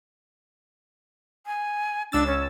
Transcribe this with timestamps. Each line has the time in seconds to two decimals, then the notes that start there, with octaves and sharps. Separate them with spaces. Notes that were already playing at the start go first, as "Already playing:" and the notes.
1.46 G#5
2.12 C#2 D4 E6 A6
2.27 C#4